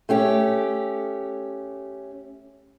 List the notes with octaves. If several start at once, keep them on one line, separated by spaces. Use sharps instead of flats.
A3 C#4 G4